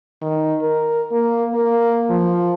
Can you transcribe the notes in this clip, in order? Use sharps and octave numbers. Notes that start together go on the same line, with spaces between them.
D#3
A#4
A#3
A#3
F3